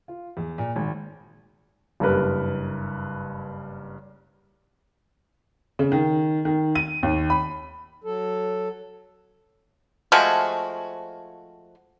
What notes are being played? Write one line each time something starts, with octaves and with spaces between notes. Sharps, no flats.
F4
E2
A#2
G#1
F#1 G2 A#4 B4
C#3
D#3
D#3
D#7
D#2
B5
F#3 A4
F3 G#3 A3 F#4